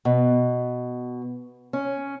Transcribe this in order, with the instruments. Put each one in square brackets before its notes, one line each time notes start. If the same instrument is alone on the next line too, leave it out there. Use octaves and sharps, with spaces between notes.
[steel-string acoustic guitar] B2
C#4